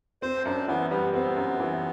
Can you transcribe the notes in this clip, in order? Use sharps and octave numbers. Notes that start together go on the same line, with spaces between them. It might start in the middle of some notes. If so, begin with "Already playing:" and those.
C4 C5
F#2 D4
E3 B3
G3 B3
B3 C4
F#2
E3